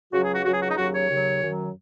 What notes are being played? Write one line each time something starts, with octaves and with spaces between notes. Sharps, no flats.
C#2 C#3 F#3 F#4
G#4
F#4
C#2 C#3 F#3 F#4
G#4
F#4
D#4
D#2 C#3 F#3 F#4
C#5
D#2 C#3 F#3
F#2 D#3 F#3